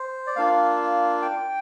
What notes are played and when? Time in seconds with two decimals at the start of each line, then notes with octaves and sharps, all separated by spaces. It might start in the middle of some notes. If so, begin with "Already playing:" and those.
Already playing: C5
0.27 D5
0.36 A#3 D4 F4 F5
1.22 G5